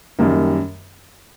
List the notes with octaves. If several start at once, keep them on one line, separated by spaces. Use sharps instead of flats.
F#2 D#3 G3 A#3